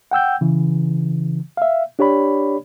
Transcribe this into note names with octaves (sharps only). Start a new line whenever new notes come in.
F#5 G5 E6 G6
C#3 E3
E5 F5
D4 G4 C#5 D5 B5